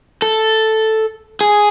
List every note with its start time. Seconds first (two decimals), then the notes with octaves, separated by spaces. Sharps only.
0.22 A4
1.41 G#4